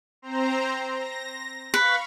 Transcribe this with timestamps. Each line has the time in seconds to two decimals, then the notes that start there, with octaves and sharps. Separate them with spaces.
0.22 C4 C5 A#5
0.89 A#6
1.74 B4 F5 B5 C#6